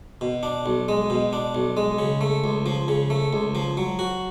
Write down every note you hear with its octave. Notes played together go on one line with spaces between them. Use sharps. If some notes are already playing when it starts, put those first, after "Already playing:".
B2
D4
B1
G#3
B2
D4
B1
G#3
C#3
A3
C#2
F3
C#3
A3
C#2
F3
F#3
F#4